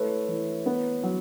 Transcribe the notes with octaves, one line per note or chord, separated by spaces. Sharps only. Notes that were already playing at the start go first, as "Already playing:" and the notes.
Already playing: A3 E4 B4 C#5
E3
B3
F#3